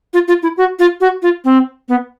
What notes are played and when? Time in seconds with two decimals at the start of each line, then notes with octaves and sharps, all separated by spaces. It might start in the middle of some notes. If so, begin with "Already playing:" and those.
0.14 F4
0.28 F4
0.43 E4
0.57 F#4
0.79 F4
1.01 F#4
1.22 F4
1.45 C4
1.89 B3